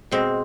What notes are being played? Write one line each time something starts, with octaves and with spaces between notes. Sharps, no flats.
B2 G#3 C4